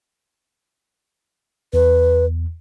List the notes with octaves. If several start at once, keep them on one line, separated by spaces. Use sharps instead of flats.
E2 B4